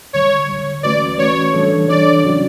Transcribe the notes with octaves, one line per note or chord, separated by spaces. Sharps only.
D2 D3 G3 C#5
D2 D3 G3
E3 A3 C#4 F#4 B4 D5
E3 A3 C#4 F#4 B4 C#5
E3 G3 D4 A4 C#5
E3 G3 D4 A4 C#5 D5
C#3 F#3 C#4 F#4